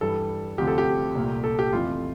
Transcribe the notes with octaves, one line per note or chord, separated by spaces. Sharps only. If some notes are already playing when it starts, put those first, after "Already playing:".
G2 E3 G3 A4
D2 C3 F3 G4
A4
G4
C2 A#2 A3
A4
G4
F2 C3 E3 A3 F4